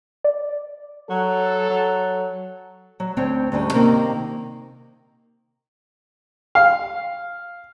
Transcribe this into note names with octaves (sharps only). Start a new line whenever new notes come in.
D5
F#3 A4
F#3
F#3
D2 C4 C5 C#5 G5
D2 G#2 G3 C#4
C3 D#3 A#3 C4
F5